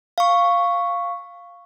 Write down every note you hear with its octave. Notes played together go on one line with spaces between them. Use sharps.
F5 C#6